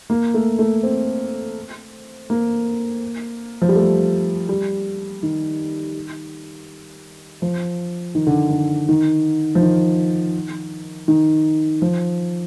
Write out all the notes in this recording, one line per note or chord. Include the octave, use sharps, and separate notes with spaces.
A#3
A3
A3
C4
A#3
F3
G3
A3
G3
D#3
F3
D#3
D3
D3
D#3
F3
D#3
D#3
F3